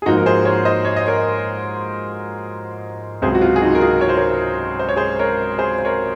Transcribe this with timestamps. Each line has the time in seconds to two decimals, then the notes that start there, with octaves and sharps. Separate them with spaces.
0.02 G#4
0.06 G#2 F3 A#3 D#4 F#4
0.17 A#4
0.26 G#4 C5
0.45 A#4 C#5
0.65 C5 D#5
0.85 C#5
0.96 D#5
1.07 A#4 C#5
3.22 C#2 C3 F#3 G#4 C5
3.35 F#4
3.41 F4
3.56 G#4
3.62 D#4 F#4
3.75 A#4
3.81 F4 G#4
4.01 C#5
4.09 C5
4.17 A#4 C#5
4.79 C5
4.89 C#5
4.96 G#4 C5
5.19 A#4 C#5
5.59 G#4 C5
5.78 C5
5.85 A#4 C#5